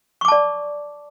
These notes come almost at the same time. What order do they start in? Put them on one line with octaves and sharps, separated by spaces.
C#6 D6 A5 D5